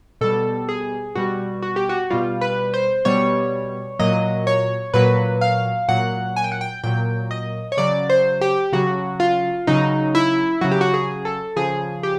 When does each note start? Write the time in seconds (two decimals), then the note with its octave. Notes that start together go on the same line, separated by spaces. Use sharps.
0.21 B2 G3 A4
0.69 G#4
1.15 B2 G3 F#4
1.62 F#4
1.76 G4
1.89 F#4
2.10 B2 G3 F4
2.41 B4
2.74 C5
3.05 B2 G3 C#5
3.99 A#2 F#3 D#5
4.47 C#5
4.94 A#2 F#3 B4
5.41 F5
5.88 A#2 F#3 F#5
6.36 G#5
6.44 G5
6.52 F#5
6.61 G5
6.84 A#2 F#3 G5
7.31 D#5
7.72 C#5
7.77 C#3 F#3 D5
8.10 C5
8.41 G4
8.73 C#3 F#3 F#4
9.20 F4
9.67 C#3 F#3 D#4
10.15 E4
10.61 C#3 F#3 F#4
10.71 G4
10.81 F#4
10.94 G#4
11.25 A4
11.56 C#3 F3 G#4
12.03 G4